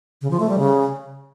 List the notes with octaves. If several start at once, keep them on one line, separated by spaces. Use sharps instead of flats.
C#3
F3
A3
G3
C#3